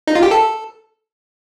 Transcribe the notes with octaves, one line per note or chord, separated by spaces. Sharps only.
D#4
F4
G4
A4